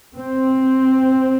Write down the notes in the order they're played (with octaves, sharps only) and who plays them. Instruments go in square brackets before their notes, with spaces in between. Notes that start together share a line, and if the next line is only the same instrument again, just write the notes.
[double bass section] C4